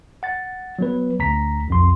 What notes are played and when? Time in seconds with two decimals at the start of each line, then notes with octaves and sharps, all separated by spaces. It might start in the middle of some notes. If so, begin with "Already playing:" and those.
0.23 F#5 A6
0.79 F#3 B3 B4
1.19 D2 A#5 B6
1.68 B1 F2 C6